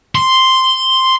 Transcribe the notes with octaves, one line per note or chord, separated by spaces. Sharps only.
C6